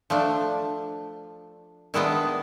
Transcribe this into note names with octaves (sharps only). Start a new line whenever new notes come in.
F3 A3 D4
D#3 G#3 B3 D4 E4